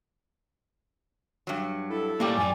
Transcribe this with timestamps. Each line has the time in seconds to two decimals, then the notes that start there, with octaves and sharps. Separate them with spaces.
1.47 G2 F#3
1.90 E4 A4
2.20 A2 G3 A#3 G4 D5
2.38 F#2 D5 G#5